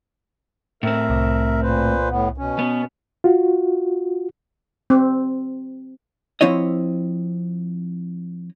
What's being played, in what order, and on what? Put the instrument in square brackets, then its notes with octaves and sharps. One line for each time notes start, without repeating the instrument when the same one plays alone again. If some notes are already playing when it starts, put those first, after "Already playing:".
[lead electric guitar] A2 C4 [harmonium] A#4 E5
[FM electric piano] C2
[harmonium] A#2 B4 C5
A2 B3
B2 C#4
[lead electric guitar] B3
[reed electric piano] F4 F#4
[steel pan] C4
[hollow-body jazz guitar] F3 C4 E4 C#5 D#5